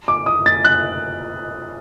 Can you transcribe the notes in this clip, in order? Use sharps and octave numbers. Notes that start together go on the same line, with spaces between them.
D6
D#6
A6
F#6